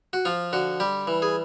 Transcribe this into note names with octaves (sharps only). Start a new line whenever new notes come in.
F#4
F3 F4
D3 F#4
G3 G4
E3
G#4